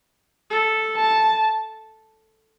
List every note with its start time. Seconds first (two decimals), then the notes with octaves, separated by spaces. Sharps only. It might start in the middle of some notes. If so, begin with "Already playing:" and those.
0.50 A4
0.96 A5